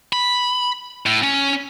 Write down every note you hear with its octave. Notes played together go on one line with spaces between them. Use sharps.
B5
A2
C#4